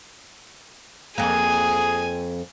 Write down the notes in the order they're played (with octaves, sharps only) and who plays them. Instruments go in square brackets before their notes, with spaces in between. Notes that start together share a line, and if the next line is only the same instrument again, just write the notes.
[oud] F2 A#3 [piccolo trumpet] G#4 [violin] G#5